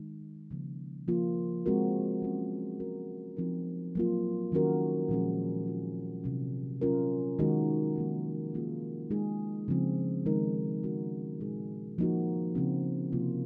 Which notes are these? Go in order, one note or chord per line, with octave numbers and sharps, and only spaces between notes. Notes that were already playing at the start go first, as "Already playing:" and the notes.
Already playing: D#3 G#3 D#4
C#3 F3 A#3
F3 A#3 F4
G#3 C4 F#4 A#4
F#3 C#4 G#4
G#3 C4 F#4 A#4
F3 C4 D#4 A#4
F#3 A#3 F4
D#3 F#3 C#4 F#4 A#4
A#2 F3 G#3 C#4 G#4
G#3 C4 F4
C3 F#3 C#4
F#3 C#4 F4 A#4
D#3 G#3 D#4 F#4 A#4
F3 A#3 D#4
F3 A#3 C#4 F4 G#4
G#3 D#4 G#4
C#3 F3 C4
D#3 G#3 D#4 A#4
G#3 C#4 F#4 A#4
A#2 G#3 D#4 G#4
F3 A#3 D#4 F#4
C#3 F3 C4
C3 F3 A#3 F4